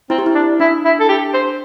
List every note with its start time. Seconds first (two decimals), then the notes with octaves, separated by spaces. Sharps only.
0.10 C4 E4
0.18 G4
0.26 E4
0.35 D4
0.60 D4 E4
0.85 E4
1.00 A4
1.09 G4
1.34 C5